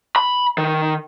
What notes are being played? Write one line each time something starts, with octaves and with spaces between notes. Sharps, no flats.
B5
D#3